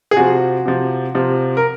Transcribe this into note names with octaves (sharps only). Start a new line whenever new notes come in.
G#4
C3 F3 F#4
C3 F3
C3 F3
A#4